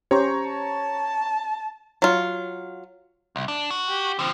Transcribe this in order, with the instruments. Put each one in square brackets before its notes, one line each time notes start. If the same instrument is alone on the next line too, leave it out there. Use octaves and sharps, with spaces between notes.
[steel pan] C#4 G4 C5 [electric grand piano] C#5 A#5 C#6
[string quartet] A5
[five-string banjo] F#3 F4
[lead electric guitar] C2
D4
F#4
[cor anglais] G4
[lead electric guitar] D3 F3 [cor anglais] C4